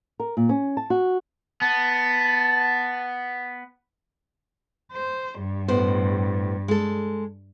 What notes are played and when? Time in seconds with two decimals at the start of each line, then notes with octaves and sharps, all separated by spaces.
0.20 A#4
0.37 A#2
0.49 C#4
0.77 A5
0.90 F#4
1.61 B3 A5
4.92 C5
5.39 G2
5.68 A2 B3 C5
6.68 G#3 A4